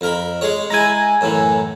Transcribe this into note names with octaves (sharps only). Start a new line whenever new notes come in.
F2 A#4 B5
G#3 G#4 C#5
G#3 E4 G#5 A#5
F#2 A2 E3